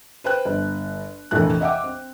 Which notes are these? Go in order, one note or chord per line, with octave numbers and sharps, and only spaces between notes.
B4 C5 G5 F#6
G1
A#1 F2 C3 E3 A3 F#6
D#5 E5 F#5 G5 D6
C4